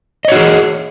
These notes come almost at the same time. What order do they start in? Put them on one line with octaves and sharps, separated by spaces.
D#5 C#5 F#4 G#4